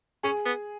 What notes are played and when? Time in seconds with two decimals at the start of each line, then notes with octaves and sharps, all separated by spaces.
0.23 C#4 G#4
0.45 B3